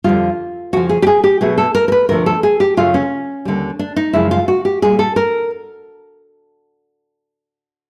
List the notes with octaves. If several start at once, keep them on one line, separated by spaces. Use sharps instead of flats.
F2 D3 G3 F4
F2 C#3 F3 F#4
G#4
G4
G#4
G4
B2 F#3 A3 G#4
A4
A#4
A#4
B4
D2 C3 F3 A3 A#4
A4
G#4
G4
F#2 C#3 F#3 A3 F4
C#4
D#2 D3 G3
D4
D#4
F#2 C#3 F3 G#3 E4
F4
F#4
G4
A#2 G3 G#4
A4
A#4